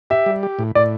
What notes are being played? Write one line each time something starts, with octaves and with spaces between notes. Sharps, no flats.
G4 E5
G3
G4
A2
A2 D5